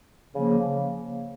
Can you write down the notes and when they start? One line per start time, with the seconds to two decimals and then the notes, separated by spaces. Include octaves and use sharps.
0.33 C#3 F3 A#3